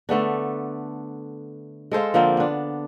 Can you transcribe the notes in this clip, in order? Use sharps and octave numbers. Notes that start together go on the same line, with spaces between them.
D3 A3 B3 D4
G#3 A4 C5 F5
D3 F3 A#3 C4
B3 D4